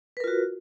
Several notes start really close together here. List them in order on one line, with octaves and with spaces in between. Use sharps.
B4 A#4 F4 F#4